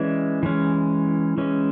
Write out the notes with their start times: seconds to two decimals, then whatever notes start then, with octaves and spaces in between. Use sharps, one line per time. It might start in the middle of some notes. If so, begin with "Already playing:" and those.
Already playing: E3 G#3 C#4 D5 E5
0.43 E3 G#3 C#4
1.38 E3 G#3 C#4